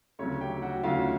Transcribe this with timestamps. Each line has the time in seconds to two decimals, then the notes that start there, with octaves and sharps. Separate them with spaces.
0.19 D2 C#3 F#3 C#4 C#5
0.41 G4 G5
0.62 F#4 F#5
0.83 D2 C#3 F#3 F4 F5